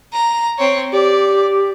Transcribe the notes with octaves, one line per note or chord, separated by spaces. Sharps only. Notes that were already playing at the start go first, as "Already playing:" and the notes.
A#5
C4 C#5
G4 D5